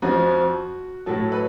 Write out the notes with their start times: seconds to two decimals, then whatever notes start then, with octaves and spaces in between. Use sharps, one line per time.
0.02 F2 F3 F#4
1.06 A2 F#3 A4
1.32 B4